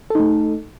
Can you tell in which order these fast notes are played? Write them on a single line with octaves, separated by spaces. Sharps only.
A4 D#4 A3